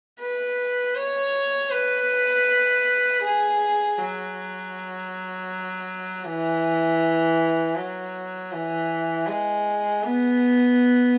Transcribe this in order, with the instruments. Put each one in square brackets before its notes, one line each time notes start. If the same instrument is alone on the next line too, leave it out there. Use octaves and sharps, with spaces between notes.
[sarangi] B4
C#5
B4
G#4
F#3
E3
F#3
E3
G#3
B3